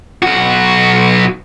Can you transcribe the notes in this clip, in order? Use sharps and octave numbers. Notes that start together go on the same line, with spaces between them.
B1 F#4